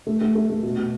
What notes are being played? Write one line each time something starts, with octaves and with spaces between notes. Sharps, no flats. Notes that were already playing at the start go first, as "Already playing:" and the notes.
A3
A3
A3
A3
B2
B2